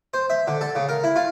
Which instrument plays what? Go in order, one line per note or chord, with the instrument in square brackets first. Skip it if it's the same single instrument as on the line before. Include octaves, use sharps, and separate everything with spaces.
[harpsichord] C5
E5
D3
A4
C#3
A#4
E4
F4